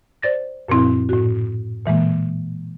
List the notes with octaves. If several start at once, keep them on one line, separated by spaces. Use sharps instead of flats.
C5 D5 A6 A#6
F#2 A#2 F3 C4 E4
A2 F#4
A#2 E3 G#3 A#3